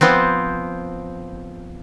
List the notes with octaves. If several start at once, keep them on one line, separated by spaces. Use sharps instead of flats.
F3 B3 C4